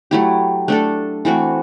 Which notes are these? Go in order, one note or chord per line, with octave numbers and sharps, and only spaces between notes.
F#3 A3 E4 G4
A3 D4 A4
E3 A3 C4 F#4